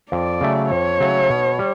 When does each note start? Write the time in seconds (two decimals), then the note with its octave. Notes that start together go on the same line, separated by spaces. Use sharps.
0.12 F2 D5
0.41 C#3 F#3 A3
0.71 F2 C#5
1.00 C#3 F#3 A3
1.30 B2
1.59 G3